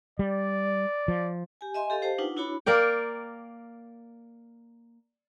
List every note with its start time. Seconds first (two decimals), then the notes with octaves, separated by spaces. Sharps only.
0.19 G3 D5
1.08 F3
1.61 G4 G#5
1.74 D#5 E5 G#5 C6
1.90 G4 A4 D#5 F5
2.02 G4 C5 F5 G5 A5
2.19 D4 D#4 F4 B4 F#5
2.37 D4 E4 F#4 C#5 B5 D6
2.66 A#3 A#4 D5 G5